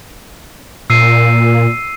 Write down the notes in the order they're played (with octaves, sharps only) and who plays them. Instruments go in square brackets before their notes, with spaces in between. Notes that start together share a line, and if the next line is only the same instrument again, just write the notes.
[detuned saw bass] A#2 [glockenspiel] E6 C7 D#7